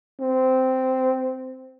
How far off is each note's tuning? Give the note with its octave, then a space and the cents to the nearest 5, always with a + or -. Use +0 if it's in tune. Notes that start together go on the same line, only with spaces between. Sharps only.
C4 -10